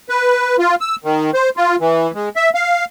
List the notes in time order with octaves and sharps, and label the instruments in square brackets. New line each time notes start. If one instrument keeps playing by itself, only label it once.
[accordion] B4
F4
E6
D#3
C5
F4
E3
G#3
E5
F5